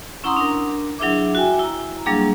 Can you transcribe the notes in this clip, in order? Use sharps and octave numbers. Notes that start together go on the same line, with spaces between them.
C#4 E4 F#5 A#5 C6 D#6
D4 A#4
F#3 D4 E4 G#4 E5 D6
F#4 E5 G5 G#5
E4 A#5
F#3 G3 A#3 D4 G#4 F5